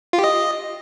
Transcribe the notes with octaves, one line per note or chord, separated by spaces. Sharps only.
F4
G4
D#5